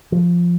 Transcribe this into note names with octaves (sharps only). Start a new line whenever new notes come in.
F3